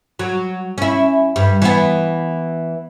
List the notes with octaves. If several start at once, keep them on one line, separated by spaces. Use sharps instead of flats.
F#3
C#4 E4
G2
E3 B3